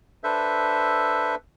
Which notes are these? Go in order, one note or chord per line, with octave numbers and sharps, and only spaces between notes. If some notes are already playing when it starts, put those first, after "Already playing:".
D4 A4 B4 C5 E5